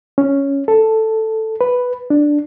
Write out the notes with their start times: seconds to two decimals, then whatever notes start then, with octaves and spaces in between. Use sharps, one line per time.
0.18 C#4
0.68 A4
1.61 B4
2.10 D4